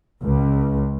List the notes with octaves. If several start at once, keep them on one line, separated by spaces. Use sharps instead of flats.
C#2